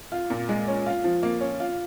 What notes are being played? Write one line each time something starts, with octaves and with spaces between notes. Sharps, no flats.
F4
A#2
G#3
C#4
F4
F3
A#3
C#4
F4